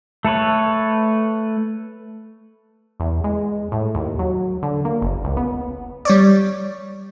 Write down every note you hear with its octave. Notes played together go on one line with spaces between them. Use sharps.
A3 A4 B4 C#5
E2
G#3
A2
D#2
F#3
D3
A#3
F#1
C#2
B3
G3 C#5 D5